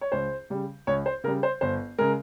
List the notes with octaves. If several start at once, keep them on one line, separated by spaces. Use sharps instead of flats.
C#5
C#2 C5
C#3 G3
C#2 C#5
C5
C#3 G3 A#4
C5
G1 C5
C#3 G#3 A#4